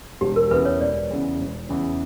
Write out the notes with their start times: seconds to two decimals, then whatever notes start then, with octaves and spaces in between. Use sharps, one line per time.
0.21 E1 G4
0.36 A#4
0.51 E2 C#3 B4
0.65 C#5
0.81 E1 D5
1.11 E2 C#3
1.40 E1
1.69 E2 C#3